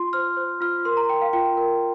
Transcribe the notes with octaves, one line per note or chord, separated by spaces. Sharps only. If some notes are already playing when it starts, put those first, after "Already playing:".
Already playing: F4 C6
C5 F6
C5
F4 F6
A#4 C6
A#5
A#4 G5
F5
F4 G5
A#4